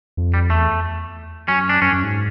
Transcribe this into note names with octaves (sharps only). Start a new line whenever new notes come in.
F2
G3
E2 A3
F#2 C#4
D4
F#2 C#4
F#2
G#2